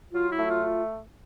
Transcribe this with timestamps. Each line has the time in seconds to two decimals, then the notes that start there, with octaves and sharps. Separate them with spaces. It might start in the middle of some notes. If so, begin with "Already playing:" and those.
0.12 F#3 F4
0.30 E4
0.38 A3
0.47 F4
0.65 F4